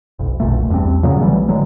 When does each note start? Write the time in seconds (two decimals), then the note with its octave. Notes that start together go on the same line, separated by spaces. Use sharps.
0.19 F#1 B1
0.40 F1 B1 A#2 A3
0.70 E2 G2 B3 C4
1.03 A#2 C#3 F#3 B3
1.21 A#1 E3 G3 A3
1.48 A1 D3 F#3 G#3